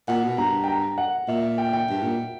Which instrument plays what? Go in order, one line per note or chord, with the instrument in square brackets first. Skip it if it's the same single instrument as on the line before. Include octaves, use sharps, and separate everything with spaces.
[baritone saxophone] A#2 [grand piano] F#5
[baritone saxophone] B2
[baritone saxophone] G2 [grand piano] A#5
[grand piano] G5
A#5
F#5
[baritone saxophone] A#2 [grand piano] E5
[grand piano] G5
G5
[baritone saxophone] G2
A#2